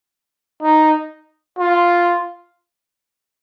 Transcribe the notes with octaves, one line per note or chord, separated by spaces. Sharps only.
D#4
F4